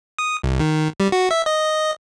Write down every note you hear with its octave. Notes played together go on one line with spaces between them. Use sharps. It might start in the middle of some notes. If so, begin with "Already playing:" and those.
D#6
C2
D#3
G3
F#4
E5
D#5